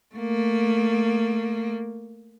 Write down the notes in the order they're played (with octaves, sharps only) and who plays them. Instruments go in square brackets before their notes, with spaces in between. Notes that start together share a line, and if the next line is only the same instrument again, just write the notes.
[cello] A3 A#3